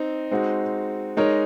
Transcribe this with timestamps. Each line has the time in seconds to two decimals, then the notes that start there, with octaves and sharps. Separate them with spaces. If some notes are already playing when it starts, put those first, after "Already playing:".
Already playing: C4 D#4
0.31 G#3 C4 D#4 F#4
1.17 G#3 D#4 A#4 C#5